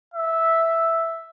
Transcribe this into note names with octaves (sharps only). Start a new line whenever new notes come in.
E5